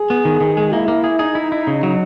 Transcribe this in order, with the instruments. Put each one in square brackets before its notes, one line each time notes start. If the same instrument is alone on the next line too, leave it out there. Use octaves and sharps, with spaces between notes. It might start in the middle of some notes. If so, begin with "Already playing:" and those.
Already playing: [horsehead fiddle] G#4
[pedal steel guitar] B3
D#3
D#3
G#3
[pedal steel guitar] A#3 [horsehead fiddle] E4
[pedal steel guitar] A#3
G#4
[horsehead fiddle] D#4 [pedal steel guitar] G#4
[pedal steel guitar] E4
E4
C#3
F#3